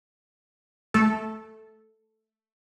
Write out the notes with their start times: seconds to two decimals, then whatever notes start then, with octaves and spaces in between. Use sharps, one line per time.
0.94 A3 A4